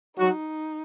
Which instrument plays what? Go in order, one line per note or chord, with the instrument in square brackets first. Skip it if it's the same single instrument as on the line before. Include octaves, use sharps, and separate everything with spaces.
[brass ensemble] F#3 F#4 [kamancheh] D#4